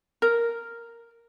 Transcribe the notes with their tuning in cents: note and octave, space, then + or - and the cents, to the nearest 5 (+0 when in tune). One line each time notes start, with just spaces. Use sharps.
A#4 -5